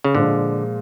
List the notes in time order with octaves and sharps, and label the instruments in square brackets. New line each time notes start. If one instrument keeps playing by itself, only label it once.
[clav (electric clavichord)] C#3
[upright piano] A#2 F3 G#3 [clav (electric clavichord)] D3